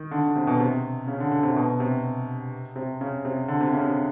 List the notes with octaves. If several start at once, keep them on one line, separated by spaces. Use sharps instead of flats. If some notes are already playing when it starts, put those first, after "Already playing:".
Already playing: D#3
D3
D3
C3
B2
C3
C#3
D3
D3
C3
B2
C3
C3
C#3
C3
D3
C3
C#3
C3